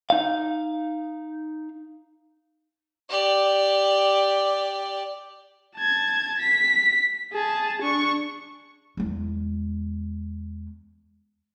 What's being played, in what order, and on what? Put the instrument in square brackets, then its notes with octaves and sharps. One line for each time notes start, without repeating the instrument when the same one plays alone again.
[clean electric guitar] D#4 F5
[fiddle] G4 D5
[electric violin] A5 G#6
B6
G#4 A5
D4 C#6
[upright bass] E2 G#3